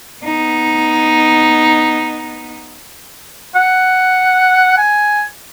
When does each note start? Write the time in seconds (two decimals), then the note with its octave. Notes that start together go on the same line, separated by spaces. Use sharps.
0.23 B3 D#4
3.56 F#5
4.78 G#5